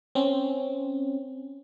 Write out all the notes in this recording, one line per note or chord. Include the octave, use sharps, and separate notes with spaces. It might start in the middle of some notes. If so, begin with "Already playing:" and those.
C4 C#4